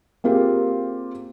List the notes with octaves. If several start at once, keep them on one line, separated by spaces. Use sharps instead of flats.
A#3 C4 F4 G4 G#4